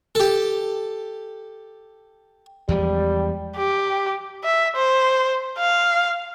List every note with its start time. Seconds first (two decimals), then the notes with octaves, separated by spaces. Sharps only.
0.15 G4 A4
2.69 E2 F3 G3 G#3
3.57 G4
4.44 E5
4.76 C5
5.59 F5